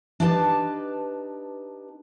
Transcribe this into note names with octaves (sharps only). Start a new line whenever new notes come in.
D4 D#4 G4 B4 G5 A5